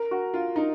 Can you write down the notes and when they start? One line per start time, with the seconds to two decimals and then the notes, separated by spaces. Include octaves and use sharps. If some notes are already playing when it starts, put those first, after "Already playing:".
Already playing: A#4
0.11 F#4
0.34 F4
0.56 D#4